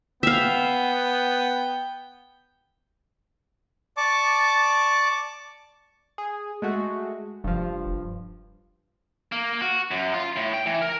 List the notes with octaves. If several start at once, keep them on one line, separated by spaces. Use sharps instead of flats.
B3 E5 F5 G5
D5 A5 C#6 D6
G#4
G#3 A3 F#4
F1 G2 F3
A#3
F#4
F#2
F4
A2
G5
E3
A#4